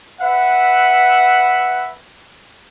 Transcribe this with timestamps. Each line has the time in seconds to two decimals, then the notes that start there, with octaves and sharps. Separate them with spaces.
0.22 B4 E5 F#5